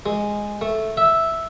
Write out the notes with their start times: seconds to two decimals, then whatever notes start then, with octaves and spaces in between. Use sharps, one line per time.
0.06 G#3
0.61 A3
0.97 E5